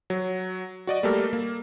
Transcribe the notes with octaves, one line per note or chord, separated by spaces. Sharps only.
F#3
F#4 D5 D#5
G3 A3 A#3 G4 A4 A#4
A#3